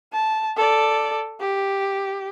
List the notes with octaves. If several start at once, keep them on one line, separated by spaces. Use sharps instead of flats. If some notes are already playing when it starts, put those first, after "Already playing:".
A5
A4 D5
G4